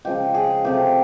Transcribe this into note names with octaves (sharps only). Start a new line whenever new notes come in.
C#3 F3 G#3 G4
G#4
C3 F3 A3 G4